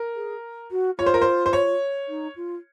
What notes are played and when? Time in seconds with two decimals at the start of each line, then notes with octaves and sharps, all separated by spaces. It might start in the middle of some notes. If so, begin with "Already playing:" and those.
Already playing: A#4
0.15 G#4
0.71 F#4
0.98 F4 C#5
1.06 C5
1.14 A#4
1.22 C5
1.46 C5
1.53 C#5
2.08 D#4
2.36 F4